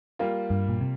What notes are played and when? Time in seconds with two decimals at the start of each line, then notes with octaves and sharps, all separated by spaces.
0.19 G3 A#3 F4
0.50 G2
0.69 A#2
0.81 C3